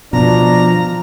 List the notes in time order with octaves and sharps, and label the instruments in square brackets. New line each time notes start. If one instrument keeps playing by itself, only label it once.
[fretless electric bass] B2 [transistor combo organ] F3 [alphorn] D4 [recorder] A#5